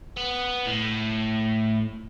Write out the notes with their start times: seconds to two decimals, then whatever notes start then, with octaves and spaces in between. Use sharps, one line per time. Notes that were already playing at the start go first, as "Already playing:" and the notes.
0.17 B3
0.66 A2